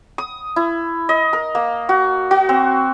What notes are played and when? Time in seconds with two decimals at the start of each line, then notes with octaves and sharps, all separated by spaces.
0.18 D#6
0.56 E4
1.09 D#5
1.33 A#4
1.55 A#3
1.89 F#4
2.31 F#4
2.49 C4